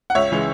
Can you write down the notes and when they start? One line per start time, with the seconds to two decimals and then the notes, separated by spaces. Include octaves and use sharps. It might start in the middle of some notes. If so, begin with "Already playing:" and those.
0.10 F#5
0.15 C#2 C#5 E5
0.31 C#3 E3 G#3